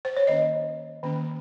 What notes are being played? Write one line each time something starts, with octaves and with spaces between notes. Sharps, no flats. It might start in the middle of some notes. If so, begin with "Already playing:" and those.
C5
C#5
D#3 A#3 C#4 D#5
D#3 A#3 C#4